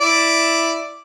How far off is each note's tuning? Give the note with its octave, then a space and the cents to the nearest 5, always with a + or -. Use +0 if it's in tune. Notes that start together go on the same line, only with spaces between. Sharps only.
E4 +0 D5 +0